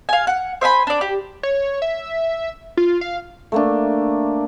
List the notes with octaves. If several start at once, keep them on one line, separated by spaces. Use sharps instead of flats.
F5 G#5
F#5
C5 E5 G#5 B5
D4 D5
G4
C#5
E5
F4
F5
A3 A#3 D4